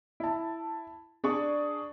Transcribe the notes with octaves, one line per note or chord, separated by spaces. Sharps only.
E4 A5
D4 G#4 D5 C#6